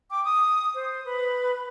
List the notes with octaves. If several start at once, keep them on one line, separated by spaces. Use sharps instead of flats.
G5 D6
D#6
C5
B4